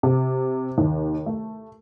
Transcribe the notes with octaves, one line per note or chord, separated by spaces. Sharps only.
C3
D#2
A3